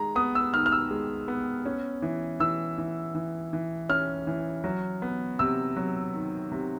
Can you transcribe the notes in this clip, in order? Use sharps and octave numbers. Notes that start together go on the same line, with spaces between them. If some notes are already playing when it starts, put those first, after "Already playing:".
Already playing: D#3 G#3 A#5
B3 D#6
E6
D#3 F6
F6
E6
G#3
B3
C#4
E3
E3 E6
E3
E3
E3
C#4 F6
E3
F#3
B3
C3 E6
F#3
D#3
C3